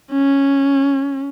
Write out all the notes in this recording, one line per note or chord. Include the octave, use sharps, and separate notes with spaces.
C#4